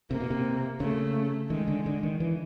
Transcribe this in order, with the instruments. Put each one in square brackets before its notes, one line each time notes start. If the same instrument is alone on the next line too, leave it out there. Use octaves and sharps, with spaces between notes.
[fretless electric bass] C3 [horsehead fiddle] A#3
[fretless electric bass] B2
C3
[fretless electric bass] C#3 [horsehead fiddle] A3
[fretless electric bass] D#3 [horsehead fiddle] G#3
[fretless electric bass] D3
D3
D#3
E3